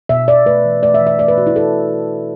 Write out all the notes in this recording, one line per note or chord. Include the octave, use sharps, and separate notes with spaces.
B2 E5
B2 D5
A3 B4
E3
A3 D5
E5
E3
E5
A3 D5
B4
B2 F#4
E4
A3 A4